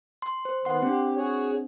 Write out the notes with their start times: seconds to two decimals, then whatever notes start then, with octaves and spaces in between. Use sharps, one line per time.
0.22 C6
0.45 C5
0.65 D#3 B3 F#5 C6
0.82 C4 D4 G4
1.16 F#4 G#4 C#5